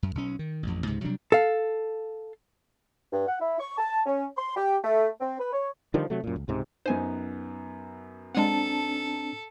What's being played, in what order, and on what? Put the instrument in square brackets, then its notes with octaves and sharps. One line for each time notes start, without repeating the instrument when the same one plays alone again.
[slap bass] F#2
B1 C#4
D#3
A1 F2
C#2 G#2 C3
C3 F#3 G3 D4
[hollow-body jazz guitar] A4 F5
[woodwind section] G2
F#5
E4
C#6
A5
C#4
C6
G4
A3
C4
B4
C#5
[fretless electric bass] D3 D#3 F3 G3
C3 F#3 A3
F#2 A#2
C#2
C#2 G#2 C3
[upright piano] F#2 B3 D#4 [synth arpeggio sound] C5 G#5
[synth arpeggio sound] G#3 F#5 [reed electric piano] C4 D4 A5 [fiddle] A4